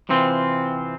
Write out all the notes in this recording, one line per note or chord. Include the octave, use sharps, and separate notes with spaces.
C3 E3 C4 F4